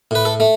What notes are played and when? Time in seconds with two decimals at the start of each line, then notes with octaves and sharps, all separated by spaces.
0.11 A2 B4
0.25 A4
0.40 A3